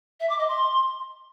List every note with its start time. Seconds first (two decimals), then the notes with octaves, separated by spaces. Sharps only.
0.20 E5
0.29 D6
0.39 D#5
0.48 C6